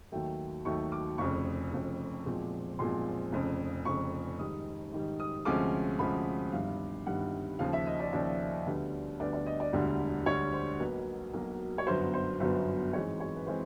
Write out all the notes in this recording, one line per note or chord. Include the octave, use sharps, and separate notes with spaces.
D#2 D#3 F#3 A3 G5
D#2 D#3 F#3 A3 C#6
D6
F1 F2 C#3 C#6
F1 F2 C#3
B1 A#2 F3 G#3 C4
B1 A#2 F3 G#3 C4 C6
F1 F2 C#3
F1 F2 C#3 C#6
G#2 D#3 G3 D#6
G#2 D#3 G3
D#6
D2 C3 F3 G#3 C#4 D6
D2 C3 F3 G#3 C#4 B5
G1 G2 D#3 G3 F5
G1 G2 D#3 G3 F#5
D#2 C#3 F3 F5
E5
D#5
D5
D#2 C#3 F3 D5
D2 D3 G3 B3 D4
D2 D3 G3 B3 D4 D5
D5
D#5
D5
E1 D2 D3 G3
E1 D2 D3 G3 C#5
C5
B1 B2 F#3 A#3 B4
B1 B2 F#3 A#3
C#5
G1 F#2 D3 F#3 B3 C5
C5
G1 F#2 D3 F#3 B3 C5
G#2 E3 G#3 C4 C#5
C#5
B4
E3 G#3 C4 C5